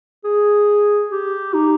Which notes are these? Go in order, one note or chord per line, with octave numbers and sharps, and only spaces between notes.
G#4
G4
D#4